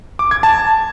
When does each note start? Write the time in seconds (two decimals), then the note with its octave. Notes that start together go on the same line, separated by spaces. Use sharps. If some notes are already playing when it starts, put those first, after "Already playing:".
0.19 D6
0.31 G#6
0.43 A5